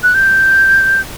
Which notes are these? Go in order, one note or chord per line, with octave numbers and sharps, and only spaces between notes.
F#6
G6